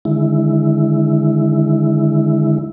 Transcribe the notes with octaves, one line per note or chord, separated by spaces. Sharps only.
D3 D#3 G#3 E4